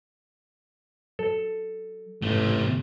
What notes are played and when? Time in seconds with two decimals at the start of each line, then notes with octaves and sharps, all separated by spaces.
1.19 F#3 A4
2.22 A1 G#2 C3 A3